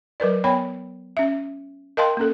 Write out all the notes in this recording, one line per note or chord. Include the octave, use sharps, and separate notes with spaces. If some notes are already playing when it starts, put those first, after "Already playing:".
F#3 A#4 B4 D5
B3 C#5 G5 B5
C#4 E5
A#4 D#5 F5 G5 A5 C6
A#3 C#4 A4